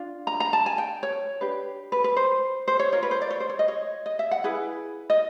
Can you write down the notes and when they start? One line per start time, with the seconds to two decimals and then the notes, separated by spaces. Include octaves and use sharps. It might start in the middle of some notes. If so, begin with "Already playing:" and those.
Already playing: D4 F4
0.27 A#5
0.40 A#5
0.53 A5
0.66 G#5
0.78 G5
1.03 C#5
1.41 D4 G4 B4
1.92 B4
2.04 B4
2.17 C5
2.68 C5
2.79 C#5
2.92 F4 A#4 C#5
3.03 B4
3.11 C5
3.22 D5
3.30 C#5
3.40 C5
3.50 C#5
3.59 D#5
3.68 C#5
4.06 D#5
4.19 E5
4.31 F#5
4.44 E4 G#4 B4
5.10 D#5